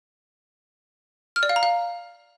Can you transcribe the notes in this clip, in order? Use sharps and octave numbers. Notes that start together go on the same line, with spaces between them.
F6
D5
F5
A#5
F5